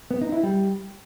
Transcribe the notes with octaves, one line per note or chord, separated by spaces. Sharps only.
B3
D#4
E4
G3